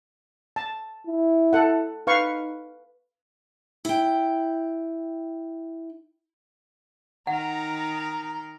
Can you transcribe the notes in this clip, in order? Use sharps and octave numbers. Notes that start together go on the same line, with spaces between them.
A5
E4
A4 F#5
D#4 B4 F5 C#6
E4 G5
D#3 D#4 A#4 F#5 A#5